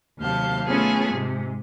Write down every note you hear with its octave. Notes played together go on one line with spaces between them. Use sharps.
D#2 C3 F#3 F5 A5 G6
A3 B3 C#4 F4 G#4 A4
G#2 C3 G#3